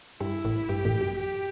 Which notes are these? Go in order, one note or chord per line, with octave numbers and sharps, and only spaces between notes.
G2 G3 E4
A1 A2
G2 G4
A1 A2
F#2
G4